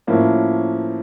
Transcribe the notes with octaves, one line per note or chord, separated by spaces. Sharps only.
A2 F3 A#3 C#4